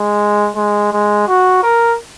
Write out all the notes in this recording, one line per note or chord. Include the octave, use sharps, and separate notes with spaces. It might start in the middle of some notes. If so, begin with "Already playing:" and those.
Already playing: G#3
G#3
G#3
F#4
A#4